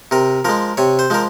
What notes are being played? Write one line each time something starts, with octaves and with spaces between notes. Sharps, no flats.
C3 A#4
F3 G#3 A#4
C3 C#5
C5
F3 G#3 A#4